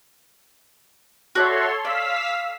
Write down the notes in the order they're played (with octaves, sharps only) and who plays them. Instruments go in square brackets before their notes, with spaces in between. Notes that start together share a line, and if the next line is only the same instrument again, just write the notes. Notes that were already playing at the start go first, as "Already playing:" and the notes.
[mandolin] F#4 D5 E5 [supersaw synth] A4 C#5 C6
[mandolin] D5 [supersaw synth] F5 E6 B6